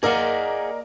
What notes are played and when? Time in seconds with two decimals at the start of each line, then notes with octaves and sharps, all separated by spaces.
0.03 A#3 G#4 A#4 D5 D#5 F5 F#5